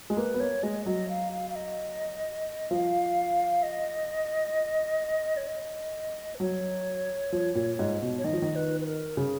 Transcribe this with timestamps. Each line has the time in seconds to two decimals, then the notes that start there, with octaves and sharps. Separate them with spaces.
0.10 G#3
0.17 A#3 B4
0.34 B3
0.40 A#3 C#5
0.63 G#3 D#5
0.86 F#3 D#5
1.09 F5
1.32 F5
1.50 F5
1.55 D#5
2.71 F3 F5
3.63 D#5
5.37 C#5
5.47 D#5
6.35 B4
6.40 F#3 C#5
7.32 F3
7.55 A#2
7.79 G#2
8.02 B2
8.18 C#5
8.24 D#3 D#5
8.33 F3
8.42 D#3
8.56 B4
8.81 B4
8.86 A#4
9.17 C#3 G#4